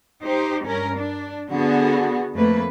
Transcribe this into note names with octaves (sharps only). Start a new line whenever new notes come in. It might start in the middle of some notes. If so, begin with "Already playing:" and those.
D#4 G4 C5
G2 C#4 A#4
D4
D3 B3 F#4 G#4
F2 A3 A#3 B4